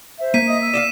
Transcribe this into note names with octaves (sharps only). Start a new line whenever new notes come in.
C5 E5
A#3 B6 D#7
D#5 E5 D#6
E6
D5 D#5 F5 E7